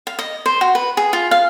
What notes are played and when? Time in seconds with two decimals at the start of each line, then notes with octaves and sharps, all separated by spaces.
0.07 F5
0.19 D#5
0.46 C5
0.61 F#4
0.75 B4
0.97 G#4
1.13 F4
1.31 F5